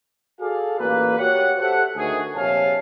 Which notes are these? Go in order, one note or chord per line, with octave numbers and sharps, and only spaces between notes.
F#4 G#4 A4 D5 F5
A1 A#2 A#3 B4
F#4 G4 C#5 D5 F#5
G4 A4 C5 E5 F#5
D2 D#3 A3 F#4 G#4
A#1 C3 C#5 F5 G#5 A5